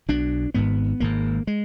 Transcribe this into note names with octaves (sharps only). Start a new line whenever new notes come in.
B1 B2 D4
G#1 G#2 B3
G#1 G#2 A#3
G#3